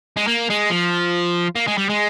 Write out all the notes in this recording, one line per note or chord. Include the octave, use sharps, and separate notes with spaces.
G#3
A#3
G#3
F3
A#3
G#3
G3
G#3